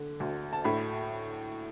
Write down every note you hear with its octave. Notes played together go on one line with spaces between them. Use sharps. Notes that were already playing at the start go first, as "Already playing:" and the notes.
Already playing: D3
D2
A5
A2 B5